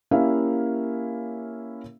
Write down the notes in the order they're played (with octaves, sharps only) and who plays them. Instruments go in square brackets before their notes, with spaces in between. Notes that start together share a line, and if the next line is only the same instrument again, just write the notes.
[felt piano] A#3 C#4 E4 G4 E5 F5